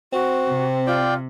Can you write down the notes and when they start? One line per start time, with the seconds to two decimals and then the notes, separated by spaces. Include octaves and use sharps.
0.13 C4 F#4
0.47 C3
0.87 F4 D5 G5